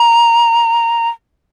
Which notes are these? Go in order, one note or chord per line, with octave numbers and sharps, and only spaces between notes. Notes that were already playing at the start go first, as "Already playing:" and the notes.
Already playing: A#5